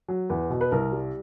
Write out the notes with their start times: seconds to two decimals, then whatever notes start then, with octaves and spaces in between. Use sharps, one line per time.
0.08 F#3
0.30 E2 B4
0.50 B2
0.61 B4
0.71 C2 A#4
0.92 G3